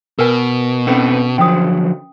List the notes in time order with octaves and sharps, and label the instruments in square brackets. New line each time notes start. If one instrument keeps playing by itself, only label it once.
[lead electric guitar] B2 [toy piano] A#4 B4 G#5
[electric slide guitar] C4 A4 B4 [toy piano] C#4
[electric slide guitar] D3 F3 F#3 [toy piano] G5 D#6